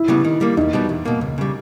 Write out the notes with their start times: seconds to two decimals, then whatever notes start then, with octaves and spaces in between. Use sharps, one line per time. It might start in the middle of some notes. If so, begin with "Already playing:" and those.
Already playing: E4
0.08 C#3 G3 B3
0.25 D#3
0.41 G3 A#3
0.57 E2 D#4
0.73 B2 G3 B3
0.89 E2
1.05 B2 A#3
1.21 C#2
1.38 C#3 G3